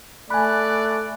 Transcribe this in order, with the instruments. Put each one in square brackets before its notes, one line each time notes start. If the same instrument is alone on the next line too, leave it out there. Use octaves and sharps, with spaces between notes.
[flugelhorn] A3 [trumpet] D5 [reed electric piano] G#5 B5 [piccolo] F#6